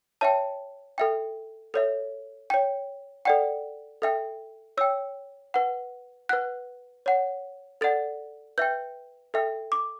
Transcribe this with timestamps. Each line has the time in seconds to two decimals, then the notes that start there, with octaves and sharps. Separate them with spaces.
0.21 C#5 E5 G5 A5
0.98 A4 E5 G5
1.74 A4 C#5 E5
2.50 C#5 G5
3.25 A4 D5 F#5 G5
4.02 A4 E5 G5
4.77 C#5 G5 E6
5.54 B4 F#5
6.29 B4 F#5 F#6
7.06 C#5 F#5
7.81 A4 D5 F#5 A6
8.58 B4 E5 G5 G6
9.34 A4 E5 G5
9.72 D6